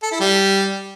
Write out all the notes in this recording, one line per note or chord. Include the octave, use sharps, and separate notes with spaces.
A4
E4
G3